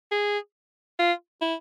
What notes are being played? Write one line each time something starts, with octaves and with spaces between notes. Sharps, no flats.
G#4
F4
E4